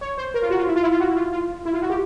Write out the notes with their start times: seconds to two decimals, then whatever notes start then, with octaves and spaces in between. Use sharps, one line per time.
0.01 C#5
0.18 C5
0.34 A#4
0.42 F4
0.50 F#4
0.59 F4
0.67 E4
0.76 F4
0.83 E4
0.92 F4
1.00 F#4
1.10 E4
1.16 F4
1.32 F4
1.66 E4
1.74 F4
1.82 F#4
1.90 G4